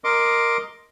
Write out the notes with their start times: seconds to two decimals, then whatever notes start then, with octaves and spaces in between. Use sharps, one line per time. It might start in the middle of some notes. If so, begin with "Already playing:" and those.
0.04 A#4 D#5 C6 D6